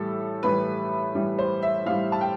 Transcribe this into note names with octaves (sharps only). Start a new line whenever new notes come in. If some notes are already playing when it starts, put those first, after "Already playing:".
Already playing: A2 E3 G3 A4
A2 E3 G3 B4
A2 E3 G3
C5
E5
A2 E3 G3 F5
A5
G5